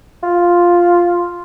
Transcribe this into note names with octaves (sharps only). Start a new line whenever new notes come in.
F4